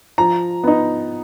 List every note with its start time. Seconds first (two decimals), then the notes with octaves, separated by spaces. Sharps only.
0.18 F3 A#5
0.64 B3 D#4